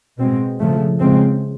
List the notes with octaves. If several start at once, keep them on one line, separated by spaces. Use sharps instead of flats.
B2 G#3 C4
C#3 F3 A3
C#3 F3 G#3 C4